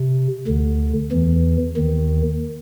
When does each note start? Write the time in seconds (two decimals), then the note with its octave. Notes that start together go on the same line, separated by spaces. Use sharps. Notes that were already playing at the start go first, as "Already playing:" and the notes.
Already playing: C3
0.47 D2 D3
1.12 E2 E3
1.77 D#2 D#3